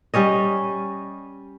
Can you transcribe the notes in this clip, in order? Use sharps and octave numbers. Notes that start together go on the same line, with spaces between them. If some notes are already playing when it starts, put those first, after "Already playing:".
G3 C#4 C#5 D#5